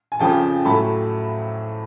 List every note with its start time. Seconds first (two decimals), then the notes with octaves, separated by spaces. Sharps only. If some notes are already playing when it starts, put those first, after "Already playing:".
0.12 G#5
0.19 F2 C#3 F3 G5 A5
0.65 A2 F#3 A3 A5 B5